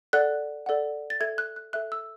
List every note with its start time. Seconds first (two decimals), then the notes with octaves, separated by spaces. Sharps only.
0.13 A4 D5 F#5 F#6
0.66 A4 D5 F#5
1.10 A6
1.20 A4 E5 G#6
1.38 F#6
1.56 F#6
1.73 A4 E5 F#6
1.92 E6